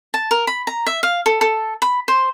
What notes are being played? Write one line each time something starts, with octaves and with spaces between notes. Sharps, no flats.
A5
A#4
B5
A#5
E5
F5
A4
A4
B5
C5